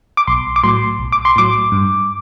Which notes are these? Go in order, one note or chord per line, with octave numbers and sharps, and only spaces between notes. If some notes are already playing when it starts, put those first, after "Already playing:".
D6
B1 C6
D6
A2 F#3 C6
B1
D6
C6
A2 F#3 D6
G2